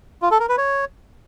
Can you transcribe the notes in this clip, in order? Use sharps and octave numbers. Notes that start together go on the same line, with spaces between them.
F4
A4
A#4
B4
C#5